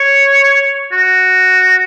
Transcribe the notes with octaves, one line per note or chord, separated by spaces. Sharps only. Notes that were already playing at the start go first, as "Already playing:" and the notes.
Already playing: C#5
F#4